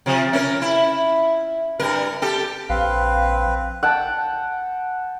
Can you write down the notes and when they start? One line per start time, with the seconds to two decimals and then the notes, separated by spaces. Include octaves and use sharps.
0.06 C3 F3
0.33 C#4 A#4
0.62 E4
1.80 G2 A#4
2.22 G4 A4
2.69 A#1 C4 B4 F5
3.83 F#5 G5 A5